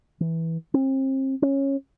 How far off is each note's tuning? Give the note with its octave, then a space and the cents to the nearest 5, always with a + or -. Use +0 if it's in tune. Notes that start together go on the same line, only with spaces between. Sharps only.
E3 -10
C4 +35
C#4 -15